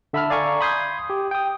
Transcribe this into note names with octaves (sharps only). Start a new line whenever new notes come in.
D3 E5 A5 B5 E6 F6
D5 F5 G#5 A#5 C#6
B5 C6 D#6 G6 G#6 C7
G4
G5 D#6